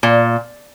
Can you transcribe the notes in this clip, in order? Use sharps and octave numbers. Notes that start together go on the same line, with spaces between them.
A#2